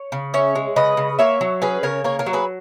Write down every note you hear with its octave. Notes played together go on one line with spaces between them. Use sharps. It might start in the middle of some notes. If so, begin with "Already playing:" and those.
Already playing: C#5
C#3
C#4 C#5 E5
G#3
C#3 B4 D#5
C#3
A#3 C#5 E5
F#3
C#4 G#4 B4
C#3 A#4 C#5
A#3 A#4 C#5
A#4 C#5
F#3
G#4 B4